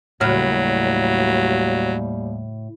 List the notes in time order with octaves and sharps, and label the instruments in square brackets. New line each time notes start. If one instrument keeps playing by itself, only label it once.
[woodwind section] D#2 G3 [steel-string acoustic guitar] A2 [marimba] C#3 F#4 B5 [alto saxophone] F#3